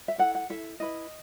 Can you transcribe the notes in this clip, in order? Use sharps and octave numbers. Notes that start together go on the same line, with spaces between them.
E5
E4 A4 F#5
F#5
E4 A4 E5
E4 B4 D#5